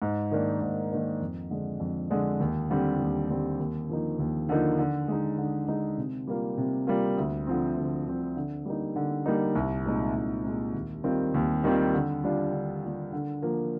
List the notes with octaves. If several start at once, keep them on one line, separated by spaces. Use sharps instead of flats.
G#2
D#3 A#3 D4
G#2
D#3 A#3 D4
F2
D3 G#3 D4
F2
D3 G#3 D4
D#2
D3 G3 C4
D#2
D3 G3 C4
D#2
D3 F3 A#3 D#4
D#2
D3 F3 A#3 D#4
D3
G#3 D#4
D3
G#3 D#4
C3
G3 A#3 F4
C3
G3 A#3 F4
D2
D3 F3 C4
D2
D3 F3 C4
D3
G3 A#3 D#4
D3
G3 A#3 D#4
C2
A#2 G#3 C4 D#4
C2
A#2 G#3 C4 D#4
D#2
D#3 G3 C4 F4
D#2
D#3 G3 C4 F4
D3
G3 D4 F4
D3
G3 D4 F4
D3
F3 A#3